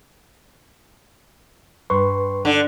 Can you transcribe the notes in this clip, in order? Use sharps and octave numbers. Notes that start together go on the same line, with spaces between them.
G2 B4 C6 C#6
D3